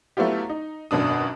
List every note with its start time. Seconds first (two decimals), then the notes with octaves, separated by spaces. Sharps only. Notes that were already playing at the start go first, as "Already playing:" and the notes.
0.17 F#3 A3 B3 E4 F4 G4
0.49 D#4
0.91 G#1 F#2 B2 D4 D#6